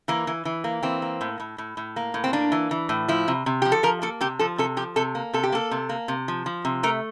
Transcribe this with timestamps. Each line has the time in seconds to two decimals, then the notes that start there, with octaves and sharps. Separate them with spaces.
0.08 E3 A#3
0.27 E3
0.45 E3
0.64 A#3
0.83 E3 C4
1.02 A#3
1.21 A2
1.40 A2
1.58 A2
1.77 A2
1.96 A#3
2.14 A2
2.24 C4
2.33 A#3 D4
2.52 E3
2.71 E3
2.89 A2
3.08 F3 E4
3.28 C3
3.46 C3
3.62 F3 G4
3.72 A4
3.83 F3 A#4
4.02 A#3 A4
4.21 C3 G4
4.39 F3 A4
4.58 C3 A4
4.77 F3 G4
4.96 C3 A4
5.15 A#3
5.33 C3 A4
5.43 G4
5.52 A#3 A4
5.71 C3
5.89 A#3
6.08 C3
6.28 F3
6.46 F3
6.65 C3
6.83 A3 A#4